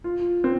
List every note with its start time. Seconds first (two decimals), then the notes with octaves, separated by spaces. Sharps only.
0.04 F4
0.44 C4